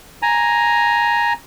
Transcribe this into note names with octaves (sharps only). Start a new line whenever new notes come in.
G#5 A#5